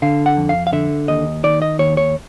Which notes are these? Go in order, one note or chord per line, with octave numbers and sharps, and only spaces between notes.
D3 F5
F#5
F2
F5
F5
D3 E5
D#2 D#5
D#3 D5
D#5
D#2 C#5
C#5